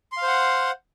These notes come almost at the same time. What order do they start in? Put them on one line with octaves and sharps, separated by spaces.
C6 F5 C5 F#5